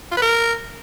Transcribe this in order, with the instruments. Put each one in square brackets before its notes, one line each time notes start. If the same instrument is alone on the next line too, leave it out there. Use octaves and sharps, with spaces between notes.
[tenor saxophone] F4
B4
A#4